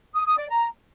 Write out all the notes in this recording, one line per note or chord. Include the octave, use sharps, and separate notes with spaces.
D#6
D#6
D5
A#5